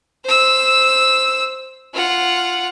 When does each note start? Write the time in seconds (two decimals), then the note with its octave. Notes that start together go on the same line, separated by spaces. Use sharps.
0.25 C5 E6
1.94 F4 F#5